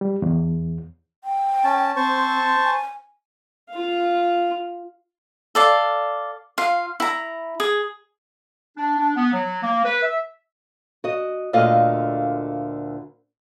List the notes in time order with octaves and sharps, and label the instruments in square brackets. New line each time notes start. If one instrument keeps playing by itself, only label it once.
[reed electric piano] G3
E2
[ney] G5
[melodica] C#4 A5
[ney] C4 [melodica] C5 A5 C#6
[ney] G#5
[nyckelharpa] F4 F5
[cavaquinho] A4 D5 F5
F4 F5
E4 A#5
G#4
[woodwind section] D4
D4
B3
F#3
A#3
B4
E5
[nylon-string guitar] F#4 D#5
D2 A#2 D3 F4 D#5 F5